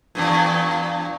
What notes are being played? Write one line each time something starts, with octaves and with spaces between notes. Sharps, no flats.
E2 G2 A#2